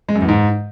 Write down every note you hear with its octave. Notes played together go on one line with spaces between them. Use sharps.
G#3
F#2
E2
G#2